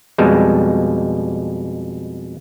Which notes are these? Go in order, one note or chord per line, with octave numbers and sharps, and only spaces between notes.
F2 B2 G3 G#3